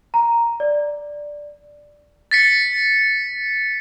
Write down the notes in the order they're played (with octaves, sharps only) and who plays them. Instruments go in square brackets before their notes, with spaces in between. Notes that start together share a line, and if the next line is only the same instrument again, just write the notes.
[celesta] A#5
D5
[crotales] A6 B6 C#7